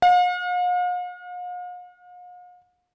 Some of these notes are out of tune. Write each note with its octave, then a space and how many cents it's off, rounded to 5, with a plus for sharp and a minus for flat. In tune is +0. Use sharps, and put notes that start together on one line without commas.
F5 +45